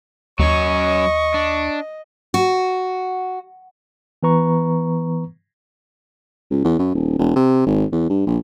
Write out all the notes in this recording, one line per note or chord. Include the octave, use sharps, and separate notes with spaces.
D#2 F#3 C#4 D#5 C#6
D4
F#4
E3 B3 B4 A#5 C#6
C#2
E2
F#2
D#1
E1
C3
G#1
E2
G2
A#1